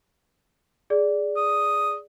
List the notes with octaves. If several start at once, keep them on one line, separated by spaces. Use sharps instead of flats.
G#4 D5
D#6